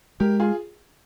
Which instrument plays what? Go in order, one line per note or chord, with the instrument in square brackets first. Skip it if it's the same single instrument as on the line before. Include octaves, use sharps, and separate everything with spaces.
[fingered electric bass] G#3 [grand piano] G4 A#4
[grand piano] F4 G#4